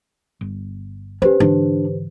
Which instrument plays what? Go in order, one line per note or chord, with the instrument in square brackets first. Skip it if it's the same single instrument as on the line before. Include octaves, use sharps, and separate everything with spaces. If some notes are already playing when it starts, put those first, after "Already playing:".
[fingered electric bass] G1
[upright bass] C#4 [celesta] G4 B4 C5
[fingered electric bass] G#2 D3 E3 [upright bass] D4